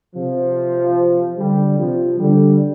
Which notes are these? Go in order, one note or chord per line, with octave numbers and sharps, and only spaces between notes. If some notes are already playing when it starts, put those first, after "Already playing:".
C3 F3
D3 G3
C3 F3
D3 G3